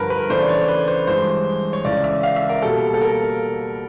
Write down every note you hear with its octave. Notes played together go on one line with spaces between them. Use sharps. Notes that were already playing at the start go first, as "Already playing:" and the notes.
Already playing: G2 D3 F3 A#4 B4
B4
C#3 E3 A3 D4 C5
D5
C#5
B4
C5
G2 E3 G#3 C5
C#5
C#2 C#3 E3 D5
E5
F5
E5
A#4
B2 G3 A#3 A4
A4
A#4